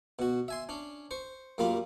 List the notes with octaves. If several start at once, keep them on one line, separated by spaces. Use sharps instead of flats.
B2 F#4
E5 G#5 C6
C#4 D4
C5 C#6
F#2 G3 A#3 F4 B5